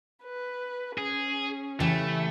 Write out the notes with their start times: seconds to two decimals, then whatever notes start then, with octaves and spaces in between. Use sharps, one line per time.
0.24 B4
0.98 C#4 G#4
1.80 C#3 E3 A3 G4